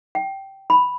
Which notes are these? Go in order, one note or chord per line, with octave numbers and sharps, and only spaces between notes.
G5
B5